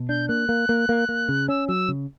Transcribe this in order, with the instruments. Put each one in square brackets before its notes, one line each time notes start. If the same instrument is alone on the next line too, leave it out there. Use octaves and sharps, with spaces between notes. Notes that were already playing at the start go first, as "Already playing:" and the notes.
Already playing: [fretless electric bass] B2
[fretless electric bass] D4 [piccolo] G6
[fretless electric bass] A#3 [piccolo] F#6
[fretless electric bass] A#3
A#3
A#3
A#3
C#3
[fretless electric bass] C#4 [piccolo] E6
[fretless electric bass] F#3 [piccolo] E6
[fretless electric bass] C#3